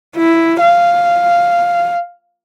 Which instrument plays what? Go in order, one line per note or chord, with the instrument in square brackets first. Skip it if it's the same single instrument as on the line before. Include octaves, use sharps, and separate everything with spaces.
[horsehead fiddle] E4
F5